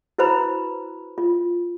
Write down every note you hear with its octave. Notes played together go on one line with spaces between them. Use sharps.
E4 F#4 B4 C5 A#5 B5
F4